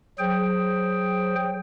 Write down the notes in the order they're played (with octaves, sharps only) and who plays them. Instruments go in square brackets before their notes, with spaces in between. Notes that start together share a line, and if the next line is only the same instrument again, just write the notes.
[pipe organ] F#3 G#4 C5 G5